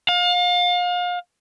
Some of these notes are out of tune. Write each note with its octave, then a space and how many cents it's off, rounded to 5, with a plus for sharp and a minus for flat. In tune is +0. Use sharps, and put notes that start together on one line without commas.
F5 +35